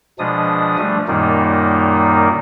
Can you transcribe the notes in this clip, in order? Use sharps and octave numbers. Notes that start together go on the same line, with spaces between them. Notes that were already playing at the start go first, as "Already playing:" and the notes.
B2 F3 G#3 D4 D#6
F3 G3 A3 D4
F#2 A#2 D#3 G3 A#3 D#4